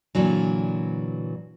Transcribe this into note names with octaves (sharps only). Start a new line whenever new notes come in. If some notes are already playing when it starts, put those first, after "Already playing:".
A#2 D3 E3 F#3